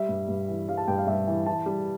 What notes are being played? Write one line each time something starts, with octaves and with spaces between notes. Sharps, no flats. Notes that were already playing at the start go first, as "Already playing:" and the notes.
Already playing: G3 E5
G2
G2
E3
G3 F5
A5
G2 G5
F5
G2 E5
E3
E3 A5
G3